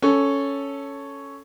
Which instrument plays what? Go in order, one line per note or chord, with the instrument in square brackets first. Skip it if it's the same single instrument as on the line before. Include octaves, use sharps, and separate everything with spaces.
[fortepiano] C#4 A4